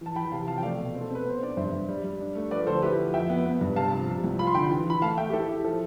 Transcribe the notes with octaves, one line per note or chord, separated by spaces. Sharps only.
E3 A5
E3 G5 B5
C3 F5 A5
F3 F5 A5
G5
A3 D5 F5
B2
C4
A4
C4 B4
B3 C5
D4 D5
G2 C5 E5
G2
G3
G3
D4
A3
F3 B4 D5
D2 A4 C5
E4 G4 B4
F3
F2 E5 G5
B3
B3
G2
C3 F5 A5
F3
C3
C2
F4 B5
C6
D3 G5 B5
E3
E3 B5
A3 F5 A5
A3 E5 G5
G4
E4 A4
E4 G4
F3 A4